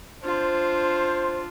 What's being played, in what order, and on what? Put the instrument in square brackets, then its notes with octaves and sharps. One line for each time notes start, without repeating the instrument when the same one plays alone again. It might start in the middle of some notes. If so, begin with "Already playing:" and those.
[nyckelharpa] D4 F4 [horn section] C5